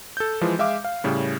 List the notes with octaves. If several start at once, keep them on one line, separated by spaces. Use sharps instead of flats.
A4 G6
E3 F3 G#3
G#3 E5 F5 D6
F5
A2 C#3 G3